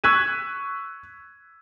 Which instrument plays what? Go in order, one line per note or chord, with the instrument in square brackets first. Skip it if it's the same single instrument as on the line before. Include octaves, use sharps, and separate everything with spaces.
[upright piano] C#6 E6 F#6 G#6 B6 D#7